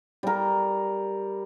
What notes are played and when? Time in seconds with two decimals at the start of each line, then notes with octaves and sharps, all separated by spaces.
0.23 G3 A#4